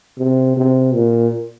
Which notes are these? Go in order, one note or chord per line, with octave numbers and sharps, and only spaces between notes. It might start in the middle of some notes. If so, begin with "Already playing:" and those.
C3
C3
A#2